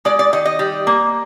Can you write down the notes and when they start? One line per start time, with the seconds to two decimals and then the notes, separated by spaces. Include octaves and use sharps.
0.05 G#3 D5
0.19 D5
0.33 D#3 D#5
0.45 D#5
0.59 G3
0.87 A#3